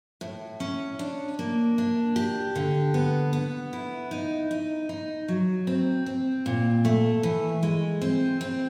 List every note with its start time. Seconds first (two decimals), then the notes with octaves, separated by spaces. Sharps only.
0.21 A2
0.60 C#4
0.99 D4
1.39 A#3
1.78 D4
2.16 G4
2.56 D3
2.94 B3
3.33 B3
3.73 E4
4.11 D#4
4.51 D#4
4.89 D#4
5.28 F#3
5.67 C4
6.06 C4
6.46 A#2
6.85 A3
7.23 E3
7.63 G#3
8.02 C4
8.41 C4